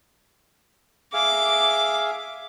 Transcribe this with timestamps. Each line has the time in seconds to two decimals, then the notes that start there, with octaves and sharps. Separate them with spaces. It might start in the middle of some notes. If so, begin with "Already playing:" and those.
1.14 G#4 E5 F5 D6